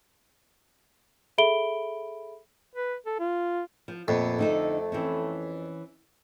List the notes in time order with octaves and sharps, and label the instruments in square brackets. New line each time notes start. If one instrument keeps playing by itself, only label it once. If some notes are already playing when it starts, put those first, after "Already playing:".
[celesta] G#4 A4 E5 B5 D7 G7
[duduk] B4
A4
F4
[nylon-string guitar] F3
[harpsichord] F2 [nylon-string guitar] A#2 B3 [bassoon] A3
[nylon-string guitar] D3 D#4 A4
E3 C4 C#4